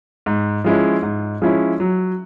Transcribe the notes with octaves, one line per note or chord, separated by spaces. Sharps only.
G#2
F3 G#3 C#4 E4
G#2
F3 G#3 C#4 E4
F#3